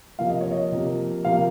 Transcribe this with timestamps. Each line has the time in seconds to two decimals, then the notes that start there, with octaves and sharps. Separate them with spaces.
0.19 C3 F3 A#3 F5
0.29 D#5
0.41 C#5
0.51 D#5
0.72 C3 F3 A#3
1.25 C3 F3 A#3 F5